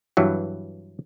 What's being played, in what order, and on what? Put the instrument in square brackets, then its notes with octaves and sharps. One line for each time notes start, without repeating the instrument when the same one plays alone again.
[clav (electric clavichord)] G2 E3 F#3